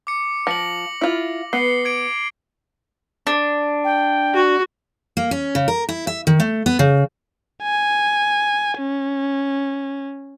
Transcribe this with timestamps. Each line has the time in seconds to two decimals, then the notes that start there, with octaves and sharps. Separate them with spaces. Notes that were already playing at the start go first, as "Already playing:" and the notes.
0.07 D6 C#7
0.47 F3 A#6 C#7 F#7
1.01 E4 F4
1.53 B3 C7 G7
1.85 D6 G#6 D7
3.27 D4
3.84 G5
4.34 F#4
5.17 A#3
5.31 C#4
5.55 C#3
5.68 A#4
5.89 E4
6.07 E5
6.27 D#3
6.40 A3
6.66 B3
6.79 C#3
7.63 G#5
8.78 C#4